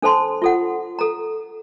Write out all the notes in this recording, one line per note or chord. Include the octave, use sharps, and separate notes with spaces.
D4 A4 C5 A5 C6
F4 A4 F#5
A4 A#5